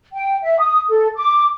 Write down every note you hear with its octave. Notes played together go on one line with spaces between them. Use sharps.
G5
E5
D#6
A4
D6